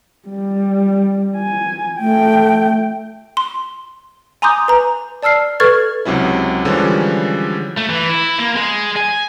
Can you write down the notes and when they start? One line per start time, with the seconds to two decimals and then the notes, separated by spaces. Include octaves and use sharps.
0.29 G3
1.37 G#5
2.00 A3 G5
3.37 C6
4.42 G#5 A#5 C6 D6 D#6 G6
4.68 B4 A#5
5.23 D5 A5 E6 F6 C7
5.60 A4 B4 C#6 F6 G#6 A6
6.05 C#2 C3 F#3 C#4 E4
6.65 D3 E3 F3 G3 G#3 C#4
7.77 A3
7.89 E3
8.09 E4
8.40 A#3
8.57 G#3
8.97 G#5